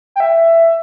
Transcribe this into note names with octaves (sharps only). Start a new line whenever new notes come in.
G5
E5